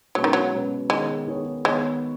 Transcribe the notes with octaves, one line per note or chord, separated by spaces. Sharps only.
B2 F#3 G#3 C#4 B4
D#3
F#3
B2 G#3 C#4 B4
D#3 G#3 B3 G#4 C#5
D#3 B3 G#4 C#5
D#3 G#3 B3 G#4 C#5